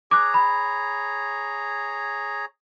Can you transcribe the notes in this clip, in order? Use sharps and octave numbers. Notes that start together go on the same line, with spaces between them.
G#4 C#5 A#5 D6 F#6
B5